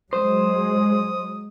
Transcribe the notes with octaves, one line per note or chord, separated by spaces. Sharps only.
F#3 G#3 C5 D#6